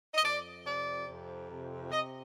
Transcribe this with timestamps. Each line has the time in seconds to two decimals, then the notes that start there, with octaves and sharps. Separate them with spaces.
0.14 D#5
0.23 F2 D5
0.65 C3 D5
1.08 F2
1.49 C3
1.90 C3 D#5